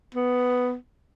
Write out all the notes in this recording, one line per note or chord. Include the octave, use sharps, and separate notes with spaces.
B3